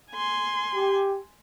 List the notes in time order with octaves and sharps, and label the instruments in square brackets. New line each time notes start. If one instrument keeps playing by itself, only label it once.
[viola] G#5 C6
[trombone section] G4